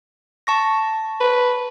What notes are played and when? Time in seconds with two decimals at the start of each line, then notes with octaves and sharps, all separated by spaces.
0.47 A5 C#6 A#6
1.20 B4